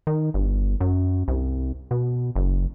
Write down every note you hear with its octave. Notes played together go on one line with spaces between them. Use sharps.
D#3
G1
F#2
C2
B2
F#1